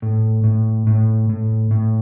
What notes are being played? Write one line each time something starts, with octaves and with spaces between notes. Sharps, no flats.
A2
A2
A2
A2
A2